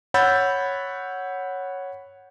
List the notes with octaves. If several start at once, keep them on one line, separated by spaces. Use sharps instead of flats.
C#5 F#5 B5 E6 G6 A6